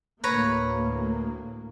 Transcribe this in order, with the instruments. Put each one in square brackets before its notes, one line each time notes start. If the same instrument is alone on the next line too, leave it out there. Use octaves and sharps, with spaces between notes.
[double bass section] D2 A2 A#3 [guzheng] B4 C#5 A#5